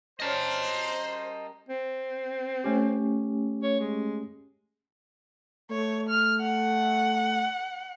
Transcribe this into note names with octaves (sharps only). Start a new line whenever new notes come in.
G3 C#4 A#4 C5 D#5 A5
C4
A3 C#4 G4
C#5
G#3
A3 C#5
F6
F#5